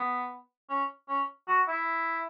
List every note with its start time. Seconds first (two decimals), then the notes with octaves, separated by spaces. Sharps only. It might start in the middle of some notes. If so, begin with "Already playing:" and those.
Already playing: B3
0.69 C#4
1.08 C#4
1.48 F#4
1.68 E4